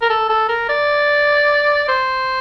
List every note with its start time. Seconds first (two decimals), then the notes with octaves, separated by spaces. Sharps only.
0.02 A#4
0.10 A4
0.29 A4
0.49 A#4
0.69 D5
1.88 C5